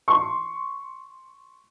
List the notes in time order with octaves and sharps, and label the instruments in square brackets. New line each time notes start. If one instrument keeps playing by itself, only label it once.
[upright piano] C6 C#6